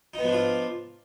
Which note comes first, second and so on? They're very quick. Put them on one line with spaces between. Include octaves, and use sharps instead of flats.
D#4 B3 F3 D4 F4